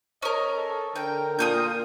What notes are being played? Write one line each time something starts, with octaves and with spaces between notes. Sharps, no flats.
C#4 A#4 D#5
A4
D3 A#4 G5
A#2 F4 D#6 G6